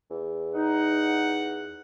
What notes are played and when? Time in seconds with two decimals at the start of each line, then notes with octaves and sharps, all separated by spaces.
0.10 E2
0.55 D#4 F#5